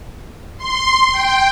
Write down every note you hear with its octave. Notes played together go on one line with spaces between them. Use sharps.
C6
G5